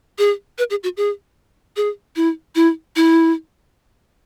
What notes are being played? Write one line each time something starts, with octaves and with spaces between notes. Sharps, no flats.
G#4
B4
G#4
F#4
G#4
G#4
E4
E4
E4